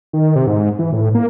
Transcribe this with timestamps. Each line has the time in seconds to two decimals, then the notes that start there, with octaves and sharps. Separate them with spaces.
0.13 D#3
0.36 C3
0.47 G#2
0.79 E3
0.93 A2
1.15 A#3